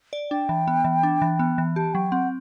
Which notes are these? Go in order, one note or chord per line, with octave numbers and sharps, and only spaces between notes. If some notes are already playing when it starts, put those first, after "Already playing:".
D5
D4 G5
E3
B3
E3
D4
E3
B3
E3
G4 A5
F#3 G5
C4 F#5